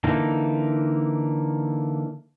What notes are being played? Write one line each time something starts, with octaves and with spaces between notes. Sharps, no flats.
D3 E3 A#3 D#4